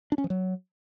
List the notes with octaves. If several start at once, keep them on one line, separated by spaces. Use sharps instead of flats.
D4
C#4
F3
F#3